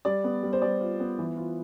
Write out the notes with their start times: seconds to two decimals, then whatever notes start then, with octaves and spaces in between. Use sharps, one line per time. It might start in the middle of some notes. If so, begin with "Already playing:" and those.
0.05 G3 D5
0.24 B3
0.43 G3
0.53 C5
0.62 G3 D5
0.80 F4
1.00 B3
1.19 E3
1.37 F4